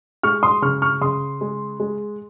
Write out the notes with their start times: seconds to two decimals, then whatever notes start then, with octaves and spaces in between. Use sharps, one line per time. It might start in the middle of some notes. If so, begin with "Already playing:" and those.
0.23 G#3 C#6 F6
0.43 C6 D#6
0.62 C#3 C#6 F6
0.82 C#6 F6
1.01 C#3 C6 D#6
1.41 G#3
1.80 G#3